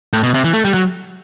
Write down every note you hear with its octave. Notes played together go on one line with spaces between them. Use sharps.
A2
B2
C3
E3
A3
G3
F#3